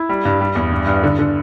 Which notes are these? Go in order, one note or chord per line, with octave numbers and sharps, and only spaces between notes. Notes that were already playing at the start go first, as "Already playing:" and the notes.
Already playing: E4
G3
G2
G3
E2
G2
G2
D3
D3